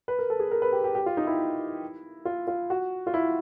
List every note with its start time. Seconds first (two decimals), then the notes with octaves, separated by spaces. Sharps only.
0.08 B4
0.19 A#4
0.30 A4
0.40 G#4
0.51 A#4
0.62 B4
0.72 G4
0.84 G4
0.95 G4
1.06 F4
1.17 D#4
1.27 E4
2.25 F4
2.47 F4
2.70 F#4
3.07 F4
3.14 E4